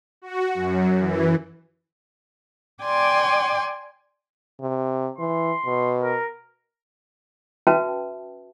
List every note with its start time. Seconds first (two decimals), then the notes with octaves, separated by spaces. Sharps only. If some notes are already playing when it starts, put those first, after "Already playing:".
0.22 F#4
0.54 F#2
0.99 E3
2.83 D5 G5 G#5 C6 D6
4.61 C3
5.19 E3 C6
5.65 B2
6.03 A#4
7.67 C#4 F#4 B4 E5 G5 A5